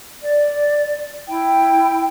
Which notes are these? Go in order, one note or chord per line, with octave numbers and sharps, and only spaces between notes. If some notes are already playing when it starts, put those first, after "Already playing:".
D5
E4 G5